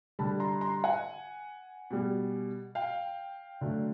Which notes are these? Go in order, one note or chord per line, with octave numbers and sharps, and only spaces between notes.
D3 G3 A5 B5
A#5 C6
A#5 C6
F#5 G#5
B2 G3
F5 G5
D3 F#3 A3